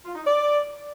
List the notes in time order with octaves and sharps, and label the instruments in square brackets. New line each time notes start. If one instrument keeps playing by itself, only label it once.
[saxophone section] F4
D#4
D5